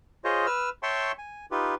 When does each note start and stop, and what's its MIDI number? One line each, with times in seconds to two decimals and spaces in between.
0.24 0.46 65
0.24 0.46 68
0.24 0.46 72
0.24 0.46 73
0.24 0.46 75
0.46 0.70 71
0.46 0.70 88
0.46 0.70 89
0.83 1.12 73
0.83 1.12 76
0.83 1.12 79
0.83 1.12 81
0.83 1.12 84
0.83 1.12 85
1.18 1.46 80
1.51 1.75 63
1.51 1.75 65
1.51 1.75 67
1.51 1.75 71